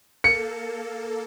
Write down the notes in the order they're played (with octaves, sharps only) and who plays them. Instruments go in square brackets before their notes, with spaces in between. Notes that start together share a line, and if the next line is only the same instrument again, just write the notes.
[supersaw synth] A#3 A4 [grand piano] C#7